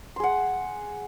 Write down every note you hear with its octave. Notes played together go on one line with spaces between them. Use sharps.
G#4 F#5 C6